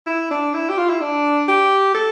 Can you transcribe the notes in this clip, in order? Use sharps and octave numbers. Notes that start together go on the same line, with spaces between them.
E4
D4
E4
G4
F4
E4
D4
G4
A4